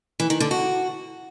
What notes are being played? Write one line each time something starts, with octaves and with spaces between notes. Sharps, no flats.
E3
D#3
D3
F#4